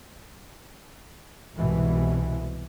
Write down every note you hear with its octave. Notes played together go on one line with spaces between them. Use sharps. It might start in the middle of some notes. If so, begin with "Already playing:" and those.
C2 G#2 B2 E3